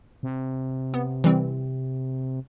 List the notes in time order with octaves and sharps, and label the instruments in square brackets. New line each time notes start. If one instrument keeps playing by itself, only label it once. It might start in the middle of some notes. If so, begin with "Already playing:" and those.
[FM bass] C3
[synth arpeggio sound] B3
E3 G3 C4